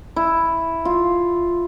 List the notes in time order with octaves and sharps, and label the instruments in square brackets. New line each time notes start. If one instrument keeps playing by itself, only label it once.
[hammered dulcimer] E4
F4